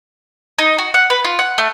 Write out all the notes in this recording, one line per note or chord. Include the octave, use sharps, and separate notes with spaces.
D#4
F#4
F#5
B4
F4
F#5
A3